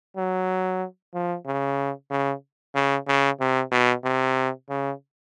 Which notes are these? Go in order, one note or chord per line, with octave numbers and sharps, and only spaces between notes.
F#3
F3
C#3
C#3
C#3
C#3
C3
B2
C3
C#3